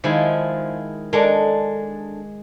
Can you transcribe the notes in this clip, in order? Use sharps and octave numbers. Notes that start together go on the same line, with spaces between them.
D#3 F3 G#3 E4
G#3 D4 A4 A#4